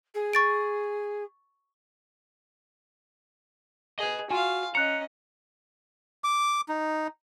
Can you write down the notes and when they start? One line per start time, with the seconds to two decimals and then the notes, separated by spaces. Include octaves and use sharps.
0.14 G#4
0.33 C#6 A6 D7
3.99 G#4 B4 D#5
4.30 F4 F#4 F5 G#5
4.75 C#4 D#5 A#5 F#6 C#7
6.24 D6
6.69 D#4